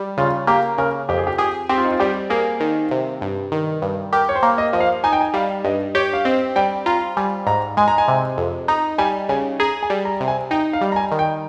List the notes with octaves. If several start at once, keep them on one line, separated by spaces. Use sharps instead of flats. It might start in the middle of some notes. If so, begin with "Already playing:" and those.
Already playing: G3
C#3 F4
A#3 G4
C#3 A#4
F2 G4
G#4
G4
G4 G#4
C4 G4
F4
D#4
F4
G3 G4
A#3 G#4
D#3
C3
G2
D#3
G2
G4 A#4
C#5
C5
A#3
D#5
F3 D#5
F5
D#4 G#5
G5
G#5
G3 F5
G2 D#5
G4 C#5
F5
C4 D#5
G3 G5
F4 A#5
G3 G#5
G#2 A#5
G#3 G#5
A#5
G#5
C3
F2
D#4 A#5
G3 G#5
C#3 G#5
G#4 A#5
G#5
G3
A#5
C3
G#5
D#4 G5
F5
G3
A#5
G#5
D#3
G5